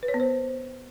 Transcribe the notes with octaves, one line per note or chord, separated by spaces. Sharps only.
B4
C#5
B3
C5